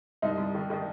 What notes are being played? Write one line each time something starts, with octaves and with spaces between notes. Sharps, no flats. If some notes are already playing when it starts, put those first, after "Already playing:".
C2 D#4
C2
D#3
D#3